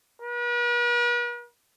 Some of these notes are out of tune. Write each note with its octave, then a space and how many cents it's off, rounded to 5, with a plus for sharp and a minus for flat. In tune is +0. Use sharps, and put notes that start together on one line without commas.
B4 -45